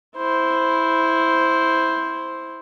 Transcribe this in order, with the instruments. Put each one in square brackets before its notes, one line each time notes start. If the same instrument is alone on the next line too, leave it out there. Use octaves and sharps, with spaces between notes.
[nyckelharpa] E4 C5